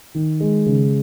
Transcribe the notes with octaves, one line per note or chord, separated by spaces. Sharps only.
D#3
G#3
C#3